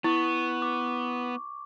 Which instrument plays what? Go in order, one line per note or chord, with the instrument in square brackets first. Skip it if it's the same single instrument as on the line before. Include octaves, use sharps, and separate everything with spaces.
[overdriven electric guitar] B3 [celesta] E4 [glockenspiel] C#6
[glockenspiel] D6